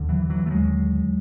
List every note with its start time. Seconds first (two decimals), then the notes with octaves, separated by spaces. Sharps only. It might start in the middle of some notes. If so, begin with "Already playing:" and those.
Already playing: D#2 D3
0.09 E3 F#3
0.30 E3 F#3
0.46 A3
0.50 D#2 D3 F#3 G#3